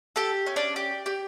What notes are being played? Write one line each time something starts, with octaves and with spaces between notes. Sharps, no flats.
G4 A4 A5
C#4
D4 D5
G4
G4